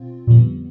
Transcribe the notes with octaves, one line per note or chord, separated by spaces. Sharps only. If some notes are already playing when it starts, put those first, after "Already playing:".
Already playing: B2 C4 F4
F2 A#2 D3 G3 B3